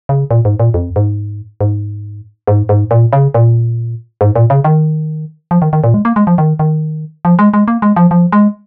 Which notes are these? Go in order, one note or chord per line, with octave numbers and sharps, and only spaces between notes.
C#3
A#2
G#2
A#2
F2
G#2
G#2
G#2
G#2
A#2
C#3
A#2
G#2
A#2
C#3
D#3
F3
D#3
D#3
A#2
G#3
A#3
G#3
F3
D#3
D#3
F3
G#3
G#3
A#3
G#3
F3
F3
G#3